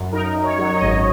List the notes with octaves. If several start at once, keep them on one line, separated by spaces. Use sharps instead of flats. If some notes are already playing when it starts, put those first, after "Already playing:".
Already playing: F#2
D#4 A#4
F#2
C#5
F#3
C#5
D#5
G#1